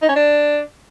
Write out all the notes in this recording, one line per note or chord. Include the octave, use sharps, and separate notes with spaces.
D#4
C#4
D4